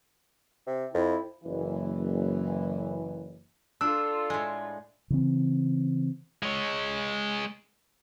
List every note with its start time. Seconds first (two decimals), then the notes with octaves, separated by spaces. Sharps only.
0.67 C3
0.94 F2 E4
1.44 F#1 E3
3.81 D4 F4 A4 E6
4.30 A2 G#3
5.10 C#3 E3 C4
6.43 G#3 C#5